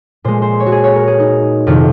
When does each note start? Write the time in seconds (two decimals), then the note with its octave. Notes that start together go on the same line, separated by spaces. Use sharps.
0.24 A#2 G#3 C5
0.42 C5
0.60 C#5
0.66 F#4
0.72 G#4
0.84 C#5
0.96 A#4
1.07 G#4
1.20 D#4
1.67 F2 C3 D#3 F4